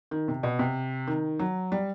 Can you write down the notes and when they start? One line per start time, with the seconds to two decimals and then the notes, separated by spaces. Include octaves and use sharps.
0.11 D#3
0.28 C3
0.43 B2
0.59 C3
1.07 D#3
1.39 F#3
1.72 G3